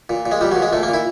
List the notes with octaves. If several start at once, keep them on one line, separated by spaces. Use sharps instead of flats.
A#2
A#2
G#3
A#2 G3
F#3
A#2
G#3
A#2 A3
A#3
A#2 E4